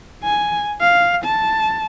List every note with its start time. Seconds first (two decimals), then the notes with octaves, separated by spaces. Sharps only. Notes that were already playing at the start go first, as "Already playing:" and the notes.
0.23 G#5
0.81 F5
1.25 A5